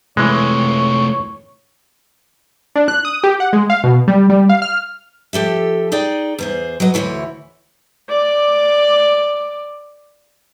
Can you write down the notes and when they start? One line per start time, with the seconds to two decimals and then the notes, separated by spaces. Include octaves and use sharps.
0.17 C3 E3 G#3 A3 C#5
2.76 D4
2.88 F#6
3.05 D#6
3.24 G4
3.40 F#5
3.53 G#3
3.70 F5
3.84 B2
4.08 G3
4.30 G3
4.49 F5
4.62 F6
5.33 F3 G4 A4 E5
5.92 D#4 G#4 D5 G5
6.39 E2 G#4 C5
6.80 F#3 B4 D#5
6.94 D2 A#2 E3 E4 C#5
8.09 D5 D6